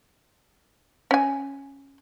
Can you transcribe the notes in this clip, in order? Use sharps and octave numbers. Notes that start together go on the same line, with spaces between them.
C#4 G#5